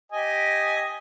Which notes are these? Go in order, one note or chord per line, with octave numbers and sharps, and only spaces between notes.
G4 D#5 G#5